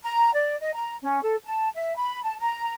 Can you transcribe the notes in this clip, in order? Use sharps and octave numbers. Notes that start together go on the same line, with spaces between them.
A#5
D5
D#5
A#5
C#4
A4
A5
E5
B5
A5
A#5